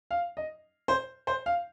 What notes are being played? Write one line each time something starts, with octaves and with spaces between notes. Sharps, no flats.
F5
D#5
C5
C5
F5